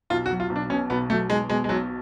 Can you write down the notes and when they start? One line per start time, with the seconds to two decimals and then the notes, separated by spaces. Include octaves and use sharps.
0.10 B1 F4
0.26 F#4
0.30 F#3
0.40 F4
0.50 B1
0.56 D4
0.70 B2 C#4
0.90 B1 B3
1.10 F#3 A3
1.30 B1 G#3
1.50 B2 G#3
1.64 G#3
1.69 B1 F#3